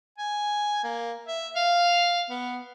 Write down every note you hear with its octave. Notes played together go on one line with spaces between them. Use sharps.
G#5
A#3
E5
F5
B3